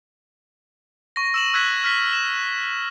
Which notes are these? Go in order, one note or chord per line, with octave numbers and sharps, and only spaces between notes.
C#6 A#6
E6 E7 F#7
E6 F#6 G#6 B6
F6 B6
E7